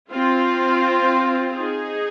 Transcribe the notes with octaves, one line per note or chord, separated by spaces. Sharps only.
C4 F4
D#4 G#4